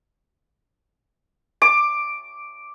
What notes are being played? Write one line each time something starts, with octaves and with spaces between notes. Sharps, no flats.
D6